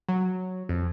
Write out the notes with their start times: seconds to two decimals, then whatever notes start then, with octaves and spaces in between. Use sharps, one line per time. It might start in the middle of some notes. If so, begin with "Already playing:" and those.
0.09 F#3
0.69 F2